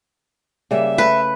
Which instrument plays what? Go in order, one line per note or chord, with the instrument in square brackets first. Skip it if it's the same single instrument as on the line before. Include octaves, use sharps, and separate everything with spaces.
[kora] C#3 G3 A#3 [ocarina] E5
[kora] A3 A4 G5 [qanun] B4